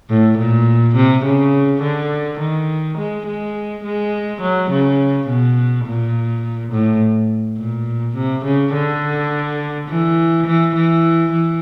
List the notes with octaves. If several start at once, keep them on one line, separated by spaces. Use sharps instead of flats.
A2
A#2
C3
C#3
D3
D#3
G#3
G#3
G#3
F#3
C#3
B2
A#2
A2
A#2
C3
C#3
D3
E3
E3
E3
E3